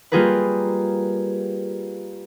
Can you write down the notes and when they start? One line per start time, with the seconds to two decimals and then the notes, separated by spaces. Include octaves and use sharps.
0.12 G3 A#3 F4 G#4 A#4 B4